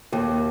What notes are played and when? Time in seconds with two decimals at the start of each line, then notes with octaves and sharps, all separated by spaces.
0.12 D#2